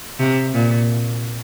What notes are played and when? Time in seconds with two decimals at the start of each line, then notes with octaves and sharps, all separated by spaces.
0.19 C3
0.53 A#2